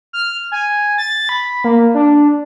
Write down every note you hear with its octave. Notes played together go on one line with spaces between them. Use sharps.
F6
G#5
A6
B5
A#3
D4